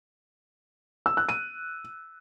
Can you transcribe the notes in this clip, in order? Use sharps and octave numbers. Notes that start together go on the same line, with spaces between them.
E6
F#6
D#7